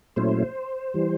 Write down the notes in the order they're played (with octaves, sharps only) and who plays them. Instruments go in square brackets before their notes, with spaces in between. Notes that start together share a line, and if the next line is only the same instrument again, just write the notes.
[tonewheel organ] A#2 F#3 A3 C#4 E4 C5
E3 G3